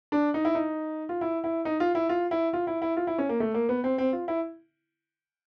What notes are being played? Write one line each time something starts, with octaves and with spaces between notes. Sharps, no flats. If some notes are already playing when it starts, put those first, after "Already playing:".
D4
D#4
E4
D#4
F4
E4
E4
D#4
F4
E4
F4
E4
F4
E4
E4
F4
E4
C#4
A#3
A3
A#3
B3
C4
C4
F4
E4